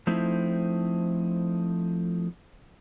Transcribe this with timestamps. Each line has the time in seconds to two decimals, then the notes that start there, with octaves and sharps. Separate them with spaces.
0.07 F3 A3 C4 D#4 E4